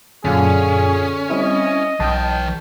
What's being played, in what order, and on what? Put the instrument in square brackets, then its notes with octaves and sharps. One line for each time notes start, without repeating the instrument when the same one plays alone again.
[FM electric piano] F#2 A#2 F4 [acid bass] D3 [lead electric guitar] C#4 [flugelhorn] G#4
[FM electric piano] G3 C4 E4 [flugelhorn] D#5
[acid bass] B1 [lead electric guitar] E3 G5 [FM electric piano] A5 G6